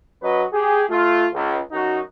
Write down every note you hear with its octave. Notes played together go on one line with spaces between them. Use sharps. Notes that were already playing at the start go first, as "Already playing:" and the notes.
F#3 C#4 F#4 B4 D#5
G4 G#4
A3 F4
C#2
F#2 D#4 F#4